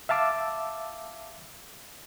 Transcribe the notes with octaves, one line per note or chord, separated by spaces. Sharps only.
E5 F5 A5 D6 E6